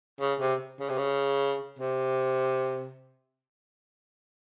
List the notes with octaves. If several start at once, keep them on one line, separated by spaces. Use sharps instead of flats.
C#3
C3
C#3
C3
C#3
C3